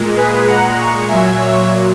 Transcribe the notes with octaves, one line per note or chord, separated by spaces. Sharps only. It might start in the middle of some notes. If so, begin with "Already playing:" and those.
Already playing: A#2 G#3
G#4 B4
F#5 A#5
A#5 C#6
A#2 F#3 E5 G#5
C#5 E5